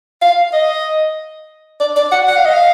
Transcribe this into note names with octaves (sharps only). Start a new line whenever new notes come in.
F5
D#5
D5
D5
F#5
F#5
F5
D#5
F5